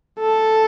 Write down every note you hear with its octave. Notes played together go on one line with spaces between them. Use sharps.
A4